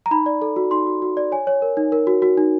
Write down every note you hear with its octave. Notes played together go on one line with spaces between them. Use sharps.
A#5
D#4 B5
D5
A4
F#4
D#4 C6
F#4
F#4
D5
C#5 G#5
C#5
A#4
D#4
A#4
F#4
F#4
D#4